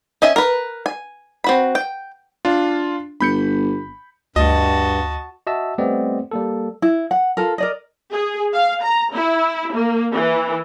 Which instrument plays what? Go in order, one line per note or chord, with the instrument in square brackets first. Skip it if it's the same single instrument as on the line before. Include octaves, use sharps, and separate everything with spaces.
[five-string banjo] C#4 D#5 E5 G#5
A#4 B4
G#5
C4 F#4 B5
G5
[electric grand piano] D4 F4
[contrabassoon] G1 [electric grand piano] B5 G6 C#7
[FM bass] D2 [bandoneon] G2 [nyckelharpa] F#4 A5 [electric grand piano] D#5
[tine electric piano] F#4 D#5 E5 A5 E6
G3 A3 B3 C4 D5 D#5
G3 A#3 A4
[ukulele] E4
F#5
F4 A4 A#4
A#4 D5 D#5
[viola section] G#4
F5
A#5
E4
A#3
E3